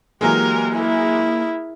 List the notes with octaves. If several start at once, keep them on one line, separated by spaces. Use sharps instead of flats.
E3 F#3 G#3 A#3 G4 A#4
E4 G#4 A#4